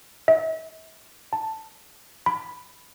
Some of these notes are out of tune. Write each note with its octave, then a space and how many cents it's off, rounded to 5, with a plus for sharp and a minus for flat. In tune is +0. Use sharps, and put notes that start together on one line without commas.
E5 -45
A5 +5
B5 +5